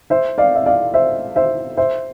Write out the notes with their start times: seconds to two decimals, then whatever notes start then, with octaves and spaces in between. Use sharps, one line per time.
0.10 C5 E5
0.38 D5 F5
0.55 E5
0.66 D5 F5
0.94 C5 E5
1.36 C5 E5
1.77 C5 E5